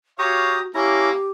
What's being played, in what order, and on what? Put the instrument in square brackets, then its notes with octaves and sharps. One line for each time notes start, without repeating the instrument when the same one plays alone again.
[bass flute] F#4 [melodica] G4 A#5 D#6 [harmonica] C#5 F5 C#6
[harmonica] A#3 [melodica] C#4 E4 A#5 [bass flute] G4